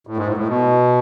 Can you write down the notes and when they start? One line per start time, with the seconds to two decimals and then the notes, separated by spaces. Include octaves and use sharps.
0.07 A2
0.17 G#2
0.27 A2
0.37 A2
0.48 B2